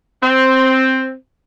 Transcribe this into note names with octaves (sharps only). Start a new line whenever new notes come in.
C4